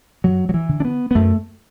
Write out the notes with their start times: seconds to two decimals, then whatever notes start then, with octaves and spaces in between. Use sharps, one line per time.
0.24 F#2 F#3
0.49 F#3
0.54 E3
0.69 D3
0.80 D4
0.85 B3
1.11 B3
1.15 F#2 A3